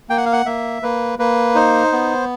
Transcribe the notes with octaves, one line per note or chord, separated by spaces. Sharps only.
A#3 G5
F#5
F5
F#5
A#3 E5
A#3 B4
A#3 B4
D#4 C5
B3